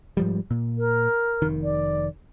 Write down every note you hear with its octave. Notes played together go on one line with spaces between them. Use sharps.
G#2 F3 G3
A#2
A#4
F1 D#3
D5